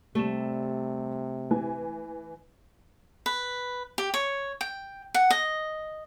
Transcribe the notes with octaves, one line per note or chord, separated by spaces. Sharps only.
C3 G3 A3 E7
E3 G#5
B4
G4
C#5
G5
F#5
D#5